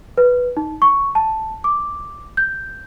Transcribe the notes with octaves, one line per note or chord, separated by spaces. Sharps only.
B4
D#4
C#6
A5
D6
G6